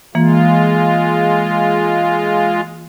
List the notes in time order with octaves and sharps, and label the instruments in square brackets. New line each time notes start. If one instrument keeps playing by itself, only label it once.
[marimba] E3 A#3 [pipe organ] G#3 F4